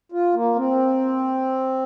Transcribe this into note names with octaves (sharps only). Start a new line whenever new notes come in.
F4
A#3
C4